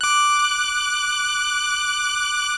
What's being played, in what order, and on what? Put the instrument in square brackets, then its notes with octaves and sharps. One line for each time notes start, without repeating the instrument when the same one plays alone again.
[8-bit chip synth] D6 F#6